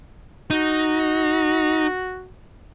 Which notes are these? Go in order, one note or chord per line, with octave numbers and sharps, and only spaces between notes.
D#4 F#4